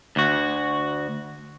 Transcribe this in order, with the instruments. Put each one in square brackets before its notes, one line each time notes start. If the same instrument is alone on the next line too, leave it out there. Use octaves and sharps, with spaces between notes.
[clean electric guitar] D2 F#4